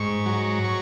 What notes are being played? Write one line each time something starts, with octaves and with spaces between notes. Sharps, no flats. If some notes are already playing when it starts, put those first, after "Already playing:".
Already playing: G#2 C#6
F#3
C#6